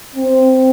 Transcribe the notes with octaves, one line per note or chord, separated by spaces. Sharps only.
C4